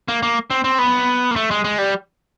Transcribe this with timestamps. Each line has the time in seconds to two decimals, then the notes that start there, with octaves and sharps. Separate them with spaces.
0.08 A#3
0.23 A#3
0.50 C4
0.64 C4
0.79 B3
1.31 A#3
1.36 A3
1.51 G#3
1.64 G#3
1.78 G3